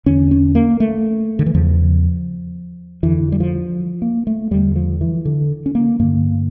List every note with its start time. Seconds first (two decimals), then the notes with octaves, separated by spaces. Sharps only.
0.06 E2 D3 C#4
0.31 C#4
0.55 A#3
0.80 A3
1.39 D3
1.46 E3
1.54 E2 C#3 F3
3.03 F2 D3 E3
3.32 G3
3.40 F3
4.02 A#3
4.27 A3
4.51 E2 D3 G3
4.76 F3
5.01 E3
5.25 D3
5.66 C#4
5.75 A#3
5.99 G2 D3 A#3